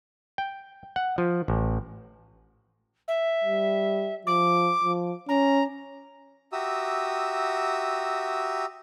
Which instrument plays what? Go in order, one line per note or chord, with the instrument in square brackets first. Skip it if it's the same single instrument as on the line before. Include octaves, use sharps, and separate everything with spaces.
[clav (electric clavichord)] G5
F#5
F3
A1
[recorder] E5
[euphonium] G3
[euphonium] F3 [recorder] D6
[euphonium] F3
[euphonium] C#4 [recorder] A#5
[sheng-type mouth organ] F#4 G4 E5 A#5 D#6 E6